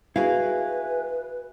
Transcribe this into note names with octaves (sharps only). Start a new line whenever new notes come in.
E4 F#4 G#4 B4 F5